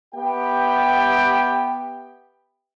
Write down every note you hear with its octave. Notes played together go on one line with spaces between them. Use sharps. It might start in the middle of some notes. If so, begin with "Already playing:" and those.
B3 G4 E5 G5